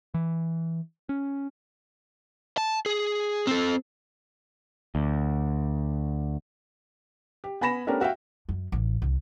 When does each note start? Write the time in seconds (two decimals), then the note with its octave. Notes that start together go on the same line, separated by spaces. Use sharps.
0.14 E3
1.09 C#4
2.58 A5
2.86 G#4
3.47 C4 A4
4.95 D2
7.44 G4
7.61 B3 G#5 B5 A#6 E7
7.87 A3 B3 C#4 D4 G4 A#4
8.01 F#4 E5 F5 G5
8.49 F#2
8.72 A1
9.02 C2